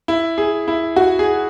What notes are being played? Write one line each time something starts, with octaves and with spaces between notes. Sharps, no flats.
E4
G#4
E4
F#4
G#4